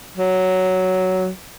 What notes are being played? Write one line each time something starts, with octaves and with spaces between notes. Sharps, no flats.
F#3